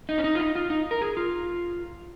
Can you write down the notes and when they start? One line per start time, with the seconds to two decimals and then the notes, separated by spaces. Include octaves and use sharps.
0.09 D#4
0.18 C#4
0.24 D#4
0.35 F4
0.39 D#4
0.55 F4
0.70 D#4
0.91 A#4
1.01 G#4
1.17 F4